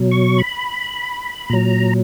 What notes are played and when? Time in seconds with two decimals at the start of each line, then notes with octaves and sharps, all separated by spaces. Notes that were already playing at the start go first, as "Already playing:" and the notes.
Already playing: B2 F#3
0.11 C#6
0.38 B5
1.50 A#2 F#3 A#5